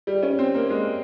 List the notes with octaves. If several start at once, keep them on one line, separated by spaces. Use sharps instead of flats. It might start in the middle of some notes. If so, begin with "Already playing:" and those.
G3
C#4
C4
A#3
G#3